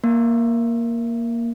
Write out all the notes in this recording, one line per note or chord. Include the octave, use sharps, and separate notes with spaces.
A#3